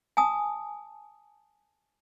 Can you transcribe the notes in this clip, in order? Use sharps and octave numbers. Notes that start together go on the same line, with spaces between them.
G#5 A5 D#6